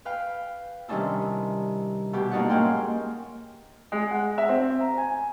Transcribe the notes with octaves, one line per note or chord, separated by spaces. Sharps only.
B4 F5 G5
C3 D#3 G3 C#4 D4 E4
D2 B2 G4
F#3 A#3 D4 D#4 D5 F#5
G#2 A#3 C#4 A#4 G5 C6
G#3
F#5
E5
C4
A#5
G#5